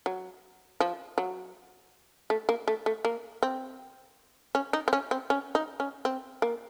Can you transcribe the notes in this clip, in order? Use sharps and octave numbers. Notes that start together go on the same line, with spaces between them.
F#3
F3
F#3
A3
A#3
A3
A3
A#3
C4
C#4
D#4
C4
C#4
C4
C#4
D#4
C#4
C4
A#3